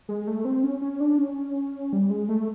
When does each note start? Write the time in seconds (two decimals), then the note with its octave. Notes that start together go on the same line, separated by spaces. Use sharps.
0.09 G#3
0.27 A3
0.45 C4
0.64 C#4
0.81 C#4
1.00 D4
1.18 C#4
1.93 G3
2.10 G#3
2.29 A3